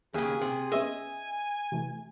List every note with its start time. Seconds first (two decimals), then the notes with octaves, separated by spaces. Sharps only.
0.14 D#2 C#3 G#4
0.42 C3
0.72 B3 C#4 G#4 D#5 E5 G#5
1.72 C3 E3 A3